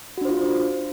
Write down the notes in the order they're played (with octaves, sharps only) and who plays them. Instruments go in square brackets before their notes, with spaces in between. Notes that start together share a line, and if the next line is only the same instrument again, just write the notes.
[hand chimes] F#4
D4
C5
F4